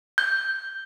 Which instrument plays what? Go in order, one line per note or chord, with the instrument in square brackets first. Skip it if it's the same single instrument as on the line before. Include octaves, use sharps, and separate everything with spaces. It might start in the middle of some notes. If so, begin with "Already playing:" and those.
[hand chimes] G6